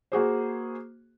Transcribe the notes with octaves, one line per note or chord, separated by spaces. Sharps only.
A#3 F#4 G#4 C5